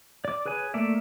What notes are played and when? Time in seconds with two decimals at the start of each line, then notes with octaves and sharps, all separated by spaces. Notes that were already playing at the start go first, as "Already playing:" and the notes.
0.25 D5 D6
0.46 G#4 B4 C#5 G#5
0.74 A3 A#3 D5 E5